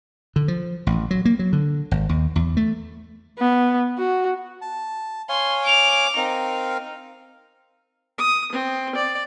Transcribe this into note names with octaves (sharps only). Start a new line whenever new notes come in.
D3
F3
A1
F#3
A#3
F#3
D3
G#1
D#2
E2
A3
B3
F#4
A5
C#5 F5 G#5 C6
D6 F7
C4 D#4 A#4 F5
D#6
C4
D5